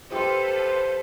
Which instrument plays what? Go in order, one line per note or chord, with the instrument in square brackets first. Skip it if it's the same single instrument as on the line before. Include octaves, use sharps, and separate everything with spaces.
[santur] G4 C6 [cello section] A4 B4 F5 [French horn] C5